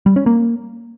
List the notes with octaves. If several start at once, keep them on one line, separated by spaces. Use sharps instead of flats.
G3
C#4
A#3